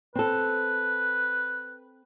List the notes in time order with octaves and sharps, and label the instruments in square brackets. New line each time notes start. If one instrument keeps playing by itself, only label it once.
[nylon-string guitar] C4 A4 [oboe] B4